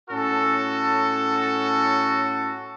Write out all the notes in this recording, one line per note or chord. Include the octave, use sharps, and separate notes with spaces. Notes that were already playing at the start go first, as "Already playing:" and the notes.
A2 C#4 F#4 A4